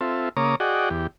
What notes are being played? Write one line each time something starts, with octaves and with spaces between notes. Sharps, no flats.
C4 F4 A4 E5
C#3 A#3 C#5 A#5 D6 D#6
F#4 G#4 D5 D#5 F#5 G5
E2 G4